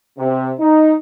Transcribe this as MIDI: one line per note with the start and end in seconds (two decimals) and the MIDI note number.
0.18 0.52 48
0.60 0.95 63